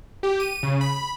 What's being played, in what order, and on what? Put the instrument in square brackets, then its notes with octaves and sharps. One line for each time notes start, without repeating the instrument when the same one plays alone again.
[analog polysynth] G4
D#7
C#3
B5